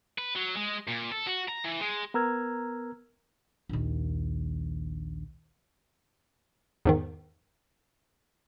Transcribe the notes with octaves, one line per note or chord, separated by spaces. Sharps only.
B4
F#3
G#3
A#2
A4
F#4
A#5
E3
G#3
B3 A#4 A#5 E6 F6 G#6
A#1 D#2
E2 G#2 D#3